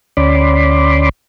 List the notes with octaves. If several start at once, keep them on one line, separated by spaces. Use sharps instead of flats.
D2 C#4 D5 B5 C6 D6